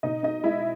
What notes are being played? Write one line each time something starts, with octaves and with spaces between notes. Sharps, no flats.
B2 D#4 D#5
D#4 D#5
G#3 E4 E5